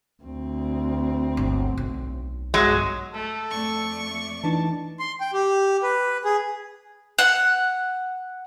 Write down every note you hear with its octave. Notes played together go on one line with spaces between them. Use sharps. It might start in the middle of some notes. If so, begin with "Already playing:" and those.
D2 C4
G1
B1
G1 F#3 G#3
A3 A4
F2 A3 D5 C#6
E3 D4 D#4 A5
C6
G5
G4
B4
G#4
F#5